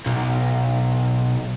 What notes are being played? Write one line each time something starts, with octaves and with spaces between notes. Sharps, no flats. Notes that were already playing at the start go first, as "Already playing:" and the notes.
B1